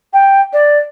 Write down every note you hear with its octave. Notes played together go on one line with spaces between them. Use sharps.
G5
D5